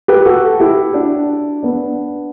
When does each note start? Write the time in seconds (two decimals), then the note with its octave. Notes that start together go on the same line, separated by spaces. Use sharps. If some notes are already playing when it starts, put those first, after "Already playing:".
0.08 G4 B4
0.25 F#4 A4
0.60 E4 G4
0.94 D4 F#4
1.63 B3 D4